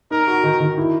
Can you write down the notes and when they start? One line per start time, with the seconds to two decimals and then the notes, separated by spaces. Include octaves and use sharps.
0.11 D#4 A#4
0.27 F#4
0.44 D#3
0.60 D#3
0.78 E4